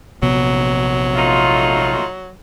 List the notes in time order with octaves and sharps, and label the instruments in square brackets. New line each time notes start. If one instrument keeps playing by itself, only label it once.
[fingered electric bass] A#1 C3 B3 [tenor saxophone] F#3
[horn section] A3 D#4 F4